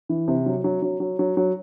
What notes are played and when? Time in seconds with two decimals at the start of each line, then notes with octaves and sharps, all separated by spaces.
0.09 E3
0.28 C3
0.46 F#3
0.64 F#3
0.82 F#3
1.00 F#3
1.19 F#3
1.37 F#3